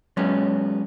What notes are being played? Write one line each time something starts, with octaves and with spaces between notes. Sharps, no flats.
F#3 G#3 B3 C#4